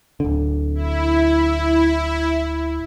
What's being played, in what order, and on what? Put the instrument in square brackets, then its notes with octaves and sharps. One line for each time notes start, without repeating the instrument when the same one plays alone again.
[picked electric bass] D1 D3
[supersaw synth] E4